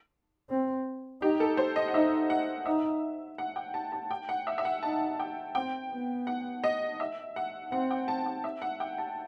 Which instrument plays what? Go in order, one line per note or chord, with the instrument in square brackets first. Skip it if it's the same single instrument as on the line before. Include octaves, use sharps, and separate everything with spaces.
[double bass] C4
[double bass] D#4 [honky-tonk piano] G4
[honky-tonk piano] A4
C5
D#5
F#5
[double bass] D#4 [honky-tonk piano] E5
[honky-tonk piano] F#5
[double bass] D#4 [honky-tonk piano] E5
[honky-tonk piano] F#5
G5
A5
A5
G5
F#5
E5
E5
F#5
[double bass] D#4 [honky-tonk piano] A5
[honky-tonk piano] G5
[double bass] C4 [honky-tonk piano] G5
[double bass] B3
[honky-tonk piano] F#5
D#5
E5
F#5
[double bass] C4 [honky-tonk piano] F#5
[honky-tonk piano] G5
A5
G5
E5
F#5
G5
A5